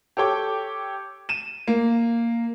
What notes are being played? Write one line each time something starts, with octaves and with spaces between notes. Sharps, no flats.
G4 A4 C#5 G5 D6
D#7 E7
A#3